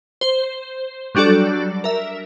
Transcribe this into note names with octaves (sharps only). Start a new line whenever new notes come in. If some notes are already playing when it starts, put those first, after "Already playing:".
C5
F#3 G3 D4 F#4 A4 D5
A#4 E5